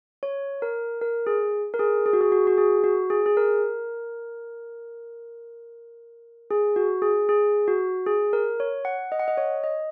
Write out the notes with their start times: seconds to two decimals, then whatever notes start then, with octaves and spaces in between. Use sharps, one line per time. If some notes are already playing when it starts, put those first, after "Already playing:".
0.23 C#5
0.62 A#4
1.01 A#4
1.27 G#4
1.74 A#4
1.79 G#4
2.06 G#4
2.13 F#4
2.21 G#4
2.32 F#4
2.47 F#4
2.58 G#4
2.84 F#4
3.10 G#4
3.26 G#4
3.37 A#4
6.51 G#4
6.76 F#4
7.02 G#4
7.29 G#4
7.68 F#4
8.06 G#4
8.33 A#4
8.60 C#5
8.85 F#5
9.12 D#5
9.20 F#5
9.28 D#5
9.37 C#5
9.64 D#5